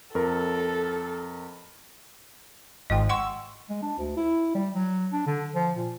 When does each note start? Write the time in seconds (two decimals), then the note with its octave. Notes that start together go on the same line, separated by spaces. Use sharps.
0.15 F2 A4 A#4
2.90 G#1 G#2 F3 D#5 G5
3.09 F#5 C6 C#6 E6
3.70 G#3
3.82 D4
3.99 D2
4.17 E4
4.55 G3
4.75 F#3
5.12 D4
5.26 D3
5.55 F3
5.75 A#2